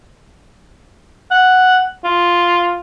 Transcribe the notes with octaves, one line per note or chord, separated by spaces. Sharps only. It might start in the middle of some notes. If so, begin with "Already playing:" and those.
F#5
F4